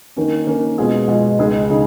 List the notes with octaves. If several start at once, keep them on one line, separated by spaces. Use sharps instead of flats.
D#3 A#3 C#4
D#3 A#3 C#4
B2 G#3 B3 F4 G#4
B2 G#3 B3 F4 G#4
C#2 C#3 G#3 D#4 G#4
C#3 G#3 D#4 G#4